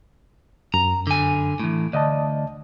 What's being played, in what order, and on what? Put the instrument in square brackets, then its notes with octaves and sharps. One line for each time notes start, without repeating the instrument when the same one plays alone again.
[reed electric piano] F#2 [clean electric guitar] A#5
[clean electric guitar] D3 G#5
A2 E3
[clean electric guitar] D2 [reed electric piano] D5 D#5 A5